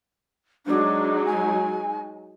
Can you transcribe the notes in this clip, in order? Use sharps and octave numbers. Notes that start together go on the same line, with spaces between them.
F#3 G#3 D4 D#4
G#5